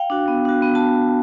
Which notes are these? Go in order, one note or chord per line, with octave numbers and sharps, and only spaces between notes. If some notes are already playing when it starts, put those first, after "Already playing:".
Already playing: F5 G5
D4 F#4
B3
D4 F#4
B3
A5